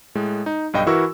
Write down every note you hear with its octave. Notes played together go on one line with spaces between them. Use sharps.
A2 G#3
D#4
B1 G2 D#5 G5
E3 E4 F#4 A#4 C#6 E6